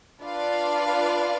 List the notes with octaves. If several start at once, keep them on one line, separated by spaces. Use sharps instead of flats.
D4 F4 B4 D5 F5